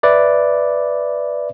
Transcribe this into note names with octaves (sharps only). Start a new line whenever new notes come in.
B4 D5 E5